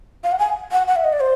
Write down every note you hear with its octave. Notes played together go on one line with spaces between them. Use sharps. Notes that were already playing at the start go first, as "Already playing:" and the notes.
F5
F#5
G#5
F#5
F#5
E5
D#5
D5
C5